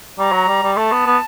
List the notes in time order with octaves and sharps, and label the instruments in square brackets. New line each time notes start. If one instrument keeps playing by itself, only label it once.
[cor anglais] G3 [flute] A#5
[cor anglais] F#3
G3
G3
[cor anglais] A3 [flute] A5
[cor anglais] B3
B3